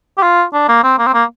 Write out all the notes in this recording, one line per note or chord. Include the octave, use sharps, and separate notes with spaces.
G4
F4
D4
A#3
C4
A#3
C4
A#3